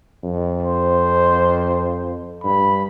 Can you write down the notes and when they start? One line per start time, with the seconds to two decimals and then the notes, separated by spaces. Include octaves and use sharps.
0.24 F2
0.63 C5
2.44 G2 B5